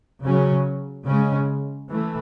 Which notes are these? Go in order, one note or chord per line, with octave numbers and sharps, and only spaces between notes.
C#3 F#3 C#4
C#3 G#3 C#4
E3 A3